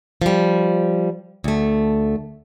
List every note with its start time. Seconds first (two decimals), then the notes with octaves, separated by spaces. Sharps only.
0.22 F3 G3
1.44 D2 A3